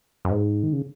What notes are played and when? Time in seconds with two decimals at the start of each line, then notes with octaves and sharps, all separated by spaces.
0.25 F#2
0.31 G#2
0.63 D#3
0.73 C#3